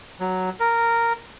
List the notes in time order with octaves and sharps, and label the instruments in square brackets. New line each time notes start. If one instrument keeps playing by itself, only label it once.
[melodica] F#3
A#4